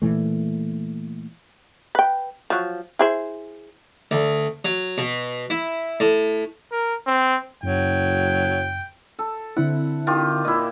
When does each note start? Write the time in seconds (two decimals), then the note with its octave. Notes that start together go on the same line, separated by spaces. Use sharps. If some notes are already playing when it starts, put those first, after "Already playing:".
0.02 A#2 E3 A3
1.95 B4 G5
2.50 F3 F#3
2.99 E4 G#4 C5
4.11 D2
4.65 F#3
4.98 B2
5.50 E4
6.00 A2
6.72 A#4
7.07 C4
7.63 F#1 F#2 F#3 G5
9.19 A4
9.56 D3 C4 E4 F#5
10.07 D#3 F4 G4
10.45 A#2 E4 D#5